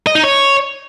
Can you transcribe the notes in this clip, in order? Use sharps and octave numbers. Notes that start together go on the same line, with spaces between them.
D#5
D#4
C#5